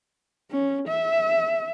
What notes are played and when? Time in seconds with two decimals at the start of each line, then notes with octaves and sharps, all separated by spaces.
0.51 C#4
0.88 E5